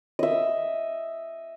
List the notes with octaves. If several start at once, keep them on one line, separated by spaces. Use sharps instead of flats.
D#5 E5